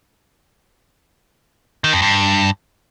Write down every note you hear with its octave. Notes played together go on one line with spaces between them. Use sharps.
D#3
F2
G2